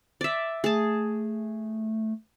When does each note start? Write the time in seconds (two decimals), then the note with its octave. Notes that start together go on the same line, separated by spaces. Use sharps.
0.21 D5 E5
0.64 A3 G#4 A5